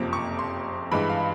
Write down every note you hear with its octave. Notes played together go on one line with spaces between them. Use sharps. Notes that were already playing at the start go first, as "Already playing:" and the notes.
Already playing: F#1 F2 C3 F3 A#3 D6
C#6
C6
G2 E3 G#3 B5
F5